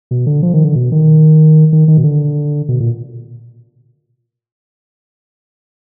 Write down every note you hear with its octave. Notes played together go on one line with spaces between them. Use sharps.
B2
D3
F3
D#3
D3
B2
D#3
D#3
D#3
B2
D3
B2
A#2